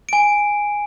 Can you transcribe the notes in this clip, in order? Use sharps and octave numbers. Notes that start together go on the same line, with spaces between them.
G#5 D7